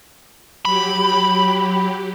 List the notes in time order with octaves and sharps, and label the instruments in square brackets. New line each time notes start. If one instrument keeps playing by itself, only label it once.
[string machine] F#3 G4 [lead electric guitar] B5